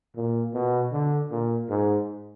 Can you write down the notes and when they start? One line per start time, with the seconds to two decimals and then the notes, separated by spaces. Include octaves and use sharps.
0.16 A#2
0.54 B2
0.92 D3
1.31 A#2
1.69 G#2